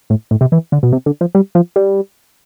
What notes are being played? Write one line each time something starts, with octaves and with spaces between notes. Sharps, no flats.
A2
A2
C3
E3
D3
B2
C3
D3
F3
G3
F3
G3